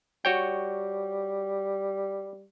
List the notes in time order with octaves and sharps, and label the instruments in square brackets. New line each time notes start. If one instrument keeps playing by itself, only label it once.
[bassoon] G3 [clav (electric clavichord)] F#4 C#5 G5